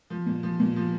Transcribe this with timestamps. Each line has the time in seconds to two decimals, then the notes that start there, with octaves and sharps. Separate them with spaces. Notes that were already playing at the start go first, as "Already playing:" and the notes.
0.10 F3
0.26 A#2
0.43 F3
0.60 A#2
0.76 F3